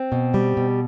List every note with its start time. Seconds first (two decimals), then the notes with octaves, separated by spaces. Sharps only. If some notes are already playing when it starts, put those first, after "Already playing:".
Already playing: C4
0.12 B2
0.34 G3
0.57 B2